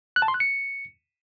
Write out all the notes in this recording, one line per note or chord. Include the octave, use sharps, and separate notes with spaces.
F#6
A5
C6
F#6
C#7